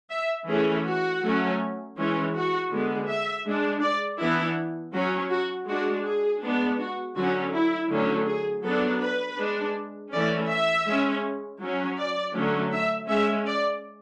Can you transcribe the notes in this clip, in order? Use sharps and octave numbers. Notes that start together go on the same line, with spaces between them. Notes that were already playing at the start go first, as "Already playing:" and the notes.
E5
E3 A3 C#4 G#4
F#4
F#3 A3 C#4
E3 G#3 C#4
F#4
D3 G#3 B3
E5
G#3 D4
D5
E3 B3 D4 E4
F#3 C#4 F#4
F#4
G#3 D4 F#4
G#4
G#3 B3 D4
F#4
D3 F#3 C#4 F#4
E4
D3 F#3 A3 C#4
G#4
F#3 B3 D4 A4
B4
G#3 D4
E3 A3 C#4 D5
E5
G#3 C#4
F#3 C#4
D5
D3 F#3 A3 C#4
E5
G#3 C#4 E5
D5